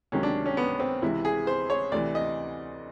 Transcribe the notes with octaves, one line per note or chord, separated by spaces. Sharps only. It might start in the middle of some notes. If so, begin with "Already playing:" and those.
C#2 C3 D#3 F#3 C#4
D4
C#4
B3
C4
C#2 C3 E3 E4
G#4
C5
C#5
D2 C3 E3 D5
D#5